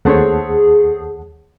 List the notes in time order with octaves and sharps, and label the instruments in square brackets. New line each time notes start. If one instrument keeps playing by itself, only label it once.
[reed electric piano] D#2 F#5 A5 [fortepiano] A3 C4 C#5 [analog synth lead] G#4